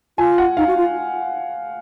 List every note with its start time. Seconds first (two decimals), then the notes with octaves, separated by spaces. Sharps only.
0.18 F4 G#5
0.38 F#5
0.57 D#4 F5
0.67 F#4
0.77 F4